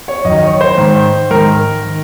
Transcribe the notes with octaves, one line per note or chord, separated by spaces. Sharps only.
C#5
F#2 D#3 D#5
C#5
C5
G#2 D#3
G#2 D#3 A#4
D#3